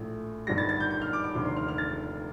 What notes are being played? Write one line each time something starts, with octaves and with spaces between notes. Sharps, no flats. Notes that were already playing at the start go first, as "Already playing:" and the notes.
Already playing: A#1 A2 A3
G1 G2 D#3 G3 A#6
A6
A6
G6
G6
F6
D6
D6
F1 D#2 D3
C6
F6
F6
A6